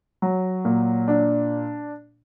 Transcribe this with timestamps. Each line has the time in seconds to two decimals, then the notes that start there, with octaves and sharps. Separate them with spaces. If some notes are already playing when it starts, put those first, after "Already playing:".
0.22 F#3
0.65 A#2
1.08 D4